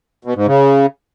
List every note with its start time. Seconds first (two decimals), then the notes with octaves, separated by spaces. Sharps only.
0.25 B2
0.36 G#2
0.47 C#3